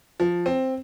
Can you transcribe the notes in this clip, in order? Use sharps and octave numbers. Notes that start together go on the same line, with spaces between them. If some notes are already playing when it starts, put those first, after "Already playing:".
F3
C4